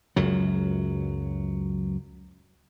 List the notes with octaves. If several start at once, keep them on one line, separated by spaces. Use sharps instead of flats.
C#2 F#2 F#3